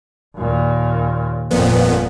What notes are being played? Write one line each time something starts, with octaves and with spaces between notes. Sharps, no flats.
D#2 A#2
G1 F2 A#2 B3